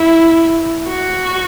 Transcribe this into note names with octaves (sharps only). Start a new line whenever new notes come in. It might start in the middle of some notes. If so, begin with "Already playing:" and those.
Already playing: E4
F#4